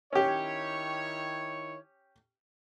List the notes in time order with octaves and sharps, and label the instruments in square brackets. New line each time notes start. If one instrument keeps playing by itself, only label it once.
[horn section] D#3 E4 C#5 [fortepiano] C#4 G4